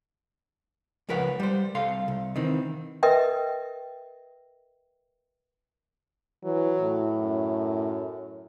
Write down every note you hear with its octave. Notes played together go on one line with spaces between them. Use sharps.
C#2 F3 A#4 B4 C#5 F#5
G3 C5
C2 A4 F5 C6
C2
D#3 E3 C4
A#4 B4 D#5 E5 G5
E3 F#3
A2
F#2